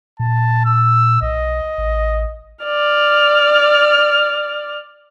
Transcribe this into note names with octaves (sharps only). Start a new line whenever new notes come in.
A#2 A5
E6
B1 D#5
A1
D5 F6